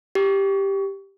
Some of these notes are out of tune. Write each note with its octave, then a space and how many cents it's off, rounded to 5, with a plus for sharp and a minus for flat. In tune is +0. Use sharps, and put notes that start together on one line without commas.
G4 +0